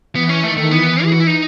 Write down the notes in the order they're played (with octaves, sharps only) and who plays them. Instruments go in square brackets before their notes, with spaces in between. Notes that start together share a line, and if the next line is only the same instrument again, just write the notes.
[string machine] E3 [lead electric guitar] B3
[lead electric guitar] C#4
[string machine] D#3 [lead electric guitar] A3
[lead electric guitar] A3
[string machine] E3 [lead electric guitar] B3
[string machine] E3
[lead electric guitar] G#4
F#4
E4
D#4